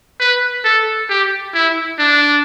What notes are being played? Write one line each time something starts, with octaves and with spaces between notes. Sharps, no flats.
B4
A4
G4
E4
D4